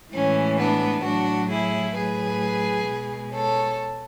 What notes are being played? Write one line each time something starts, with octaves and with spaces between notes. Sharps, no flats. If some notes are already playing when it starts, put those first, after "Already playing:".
A2 E3 G#3 C#4
B3 D4
A2 F#3 D4 F#4
E4 G#4
A2 F#3 G#4 B4
B2 G#3
A4 C#5